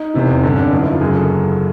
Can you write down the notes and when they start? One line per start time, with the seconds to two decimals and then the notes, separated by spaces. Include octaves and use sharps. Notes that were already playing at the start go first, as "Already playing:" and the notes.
Already playing: D#4
0.14 F1 E2 C3 E3
0.43 G#1 G2 D3 C#4
0.57 D4
0.72 G1 F#2 D#3 D#4
0.81 E4
0.91 F4
1.00 F#1 F#2 C#3 F#3 G#4
1.15 A4